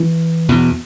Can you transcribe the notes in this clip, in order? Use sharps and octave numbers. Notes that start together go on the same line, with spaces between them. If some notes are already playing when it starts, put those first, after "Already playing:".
Already playing: E3
E2 B2